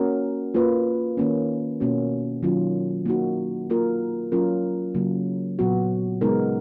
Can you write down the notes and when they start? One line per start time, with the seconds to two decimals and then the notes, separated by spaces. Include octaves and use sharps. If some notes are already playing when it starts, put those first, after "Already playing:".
Already playing: A#3 C#4 F#4 A#4
0.54 A#3 F4 B4
1.17 D#3 A#3 C#4
1.80 B2 A#3 C#4 F#4
2.43 D#3 F#3 C#4 F4
3.06 A#3 D#4 F#4
3.70 A#3 F4 A#4
4.32 F#3 C#4 F4 A#4
4.95 C#3 F#3 A#3
5.59 A#2 F#3 B3 F#4
6.21 C#3 G#3 B3 D#4 A#4